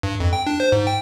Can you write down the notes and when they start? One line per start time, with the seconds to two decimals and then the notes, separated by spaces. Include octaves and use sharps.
0.03 G2
0.20 F2
0.33 G5
0.47 D4
0.60 C5
0.72 G#2
0.87 G5